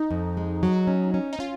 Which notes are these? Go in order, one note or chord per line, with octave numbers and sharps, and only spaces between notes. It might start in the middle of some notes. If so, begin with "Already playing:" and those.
Already playing: D#4
F2
G#3
F#3
C#4
C#4
D#4
C#4 F4